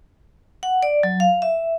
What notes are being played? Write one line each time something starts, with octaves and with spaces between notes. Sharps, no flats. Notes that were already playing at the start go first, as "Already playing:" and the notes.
F#5
D5
F#3
F5
E5